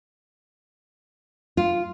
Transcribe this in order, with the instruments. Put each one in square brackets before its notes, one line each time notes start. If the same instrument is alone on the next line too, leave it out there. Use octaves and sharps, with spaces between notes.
[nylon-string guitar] F4